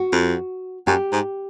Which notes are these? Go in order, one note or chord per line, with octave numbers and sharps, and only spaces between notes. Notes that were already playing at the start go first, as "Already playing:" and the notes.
Already playing: F#4
F2
F#2 G4
G#2